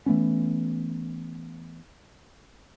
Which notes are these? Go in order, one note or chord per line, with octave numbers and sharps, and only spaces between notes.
E3 A3 B3 C#4